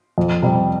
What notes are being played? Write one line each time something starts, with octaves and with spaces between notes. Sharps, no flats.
F2
C3 G3